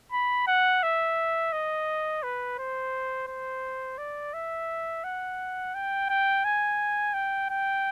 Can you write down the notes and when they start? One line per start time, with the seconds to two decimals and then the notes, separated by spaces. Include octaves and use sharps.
0.12 B5
0.47 F#5
0.83 E5
1.52 D#5
2.23 B4
2.58 C5
3.27 C5
3.98 D5
4.34 E5
5.04 F#5
5.74 G5
6.09 G5
6.44 G#5
7.14 G5
7.50 G5